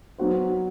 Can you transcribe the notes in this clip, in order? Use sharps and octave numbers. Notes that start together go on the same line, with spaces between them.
F#3 B3 D#4 F#4 C5